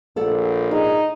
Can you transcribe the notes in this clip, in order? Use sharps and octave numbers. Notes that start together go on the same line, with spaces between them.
A#1 A4 D5 F#5
D#4 G#4